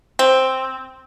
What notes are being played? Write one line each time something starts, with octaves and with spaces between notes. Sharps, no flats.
C4